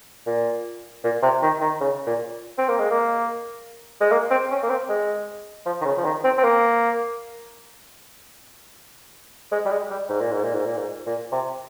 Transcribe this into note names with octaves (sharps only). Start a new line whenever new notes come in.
A#2
A#2
C3
D#3
D#3
C#3
A#2
C4
A#3
G#3
A#3
G#3
A#3
C4
C#4
A#3
C4
G#3
F3
D#3
C#3
F3
D#3
C4
C4
A#3
G#3
G3
G#3
G3
G#2
A#2
G#2
A#2
G#2
A#2
G#2
A#2
C3